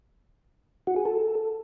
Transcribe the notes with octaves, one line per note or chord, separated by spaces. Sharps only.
F#4
G#4
A4